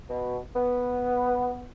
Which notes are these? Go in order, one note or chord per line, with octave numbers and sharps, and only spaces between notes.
B2
B3